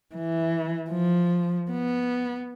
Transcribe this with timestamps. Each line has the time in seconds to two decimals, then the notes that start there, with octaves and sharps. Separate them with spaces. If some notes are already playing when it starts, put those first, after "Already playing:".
0.15 E3
0.90 F3
1.71 B3